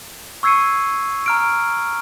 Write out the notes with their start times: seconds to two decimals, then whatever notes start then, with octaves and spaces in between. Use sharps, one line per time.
0.43 C#6 E6 G#6 C7 C#7 D#7
1.26 A#5 F6 D7